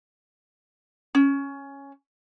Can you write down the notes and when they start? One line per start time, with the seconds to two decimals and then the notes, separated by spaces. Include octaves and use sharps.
1.15 C#4